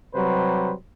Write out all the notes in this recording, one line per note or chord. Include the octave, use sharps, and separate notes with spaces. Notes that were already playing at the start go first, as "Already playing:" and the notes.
C3 F#3 G3 B4 C5